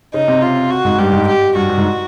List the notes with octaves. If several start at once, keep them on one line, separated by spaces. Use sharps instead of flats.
C#3 D#4
C3
F4
F#4
G#2
G2 G4
G#2
G4
G2 F#4
G2
G#2